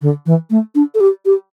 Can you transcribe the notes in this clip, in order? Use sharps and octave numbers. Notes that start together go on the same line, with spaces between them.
D3
E3
A3
D4
A4
G4
G4